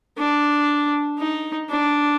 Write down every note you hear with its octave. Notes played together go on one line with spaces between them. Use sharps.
D4
D#4
D4